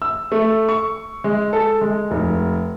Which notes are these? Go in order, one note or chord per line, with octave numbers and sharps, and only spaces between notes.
E6
A3
C#6
G#3
A4
G#3
F1